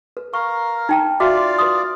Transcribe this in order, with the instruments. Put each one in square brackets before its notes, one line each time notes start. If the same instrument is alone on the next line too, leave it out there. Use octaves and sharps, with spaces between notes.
[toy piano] B4
[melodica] A#4 F5 [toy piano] C#6
[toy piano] D#4 G5 A#5
[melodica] F4 D5 F5 [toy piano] F#4 E5 D6
[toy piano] B4 C6 D#6